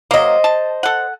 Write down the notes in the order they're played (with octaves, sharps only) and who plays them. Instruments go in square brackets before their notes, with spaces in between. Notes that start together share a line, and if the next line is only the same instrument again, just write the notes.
[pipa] F#3 A#3 [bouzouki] C5 D#5
[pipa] A5
A4 F#5